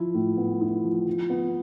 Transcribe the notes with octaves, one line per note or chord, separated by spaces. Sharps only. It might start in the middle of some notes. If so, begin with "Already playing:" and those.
Already playing: F3 E4
A2
B3
E4
F3
F3
B3